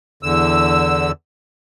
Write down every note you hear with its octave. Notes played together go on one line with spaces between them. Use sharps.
E2 D3 E6